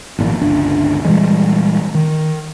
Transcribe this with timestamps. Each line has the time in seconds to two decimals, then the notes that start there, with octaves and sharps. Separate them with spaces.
0.18 G#1 A#2 F3
0.41 G1 C#2 D4
1.05 A#2 E3 G3 G#3
1.95 D#3